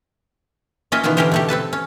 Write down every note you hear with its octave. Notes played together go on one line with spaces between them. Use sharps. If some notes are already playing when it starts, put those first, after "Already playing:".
A#3 C#4 F4 D#5 E5 G5
B2 D#3 E3 B3 F4
D3 E3 C#4 G4 A#4 C5
B2 A3 G4
C4 A4 B4 A5
C#4